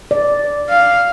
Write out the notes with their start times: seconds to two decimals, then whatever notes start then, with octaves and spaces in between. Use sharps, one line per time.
0.11 D5
0.70 F5